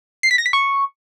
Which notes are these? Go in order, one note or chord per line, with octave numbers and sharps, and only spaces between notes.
C7
B6
A#6
B6
C#6